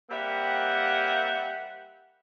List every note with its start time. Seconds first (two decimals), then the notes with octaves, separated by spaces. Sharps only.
0.10 G3 A#3 C4 E5 F#5